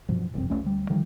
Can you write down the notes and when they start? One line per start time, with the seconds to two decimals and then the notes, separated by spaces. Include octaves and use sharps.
0.09 G2 B2 F3 F#3
0.34 F#1 C2 F2 C4
0.50 E1 B1 A3 C#4
0.64 D2 G3
0.90 D3 D#3 F3 G3